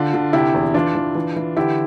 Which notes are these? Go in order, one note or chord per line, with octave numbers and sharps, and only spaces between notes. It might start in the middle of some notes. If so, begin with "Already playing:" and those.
Already playing: D3 D4 F4
D3
C3 E4 G4
E2
E3 D4 F4
E3
E3
E3
D3 E4 G4